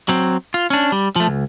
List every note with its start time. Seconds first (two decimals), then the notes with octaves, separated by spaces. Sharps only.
0.09 F#3 C4
0.54 F4
0.70 C#4 D4
0.92 G3
1.16 F3 A3
1.27 C#2